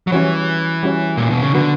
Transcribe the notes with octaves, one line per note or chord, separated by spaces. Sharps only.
F#3
E3 G3 C#4 F#4 C#5
G3 C#4 F#4 C#5
A#2
B2
C#3
D3 B3 F#4 B4